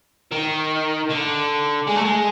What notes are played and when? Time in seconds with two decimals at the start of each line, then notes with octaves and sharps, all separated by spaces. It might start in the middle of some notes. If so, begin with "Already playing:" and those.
0.32 D#3
1.09 D3
1.87 G#3
1.96 A3
2.04 G#3